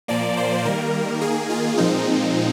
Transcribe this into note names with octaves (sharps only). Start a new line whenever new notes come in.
A#2 F3 A#3 D5
C5
D#3 G3 A#3 A#4
D#3 A#3 G#4
F4
A#2 F3 G#3 C4 D#4